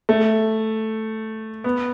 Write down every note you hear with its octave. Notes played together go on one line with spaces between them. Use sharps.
A3
B3